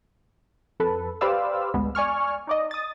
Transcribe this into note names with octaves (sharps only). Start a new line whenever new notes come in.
F2 A4 B4
G4 B4 C5 D5 F5 E6
A1 D2 G#3 B3
D5 G#5 C#6 F6
D#4 D5 D#5
D#6 A6